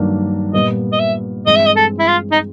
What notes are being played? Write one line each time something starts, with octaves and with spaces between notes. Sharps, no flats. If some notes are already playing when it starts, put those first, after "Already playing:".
Already playing: G2 D#3 F#3 A#3 D4
A#2 G3 B3 D#5
D#5
E5
G2 E3 G#3 C4 D#5
E5
D#5
A4
E4
F4
D#4